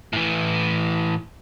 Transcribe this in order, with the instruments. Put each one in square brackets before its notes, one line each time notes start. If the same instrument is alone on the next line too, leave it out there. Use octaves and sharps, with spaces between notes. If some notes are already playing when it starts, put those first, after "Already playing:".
[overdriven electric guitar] A2 E3